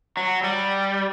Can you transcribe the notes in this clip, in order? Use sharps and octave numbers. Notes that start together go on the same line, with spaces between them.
F#3
G3